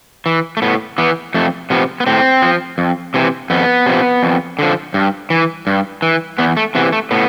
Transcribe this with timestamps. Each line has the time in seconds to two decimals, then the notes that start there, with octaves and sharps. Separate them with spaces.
0.26 E3
0.57 A3
0.62 A2 B3
0.98 E3 B3
1.34 F2 A3
1.70 C3 F3 B3
2.00 B3
2.06 A2 C4
2.42 F3
2.78 F2
3.14 C3 E3
3.50 F2 B3
3.86 C3 F3
4.23 F2
4.59 D3 F3
4.94 G2
5.30 E3
5.67 G2
6.02 E3
6.38 E2 B3
6.57 A3
6.75 C3 E3 B3
6.92 A3
7.11 A2 B3